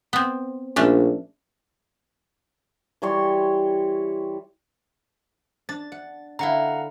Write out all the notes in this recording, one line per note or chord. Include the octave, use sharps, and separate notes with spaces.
B3 C4
A#1 A3 C#4 D4
E3 G3 C#5 C6
D4 A6
F#5
D3 E4 F5 F#5 A#5